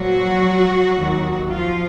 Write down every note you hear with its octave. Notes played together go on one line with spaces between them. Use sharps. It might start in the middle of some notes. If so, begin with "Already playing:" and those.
Already playing: A#2 F3 F#3 F#4
D#2 D#3 F#3
F3 F4